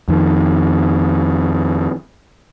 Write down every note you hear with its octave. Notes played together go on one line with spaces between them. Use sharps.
F2 D#3